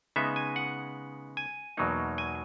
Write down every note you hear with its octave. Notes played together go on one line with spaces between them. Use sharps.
C#3 G#3 B3 D#4 E5
G#5
F#5
G#5
E2 B2 F#3 A#3 D#4
G#5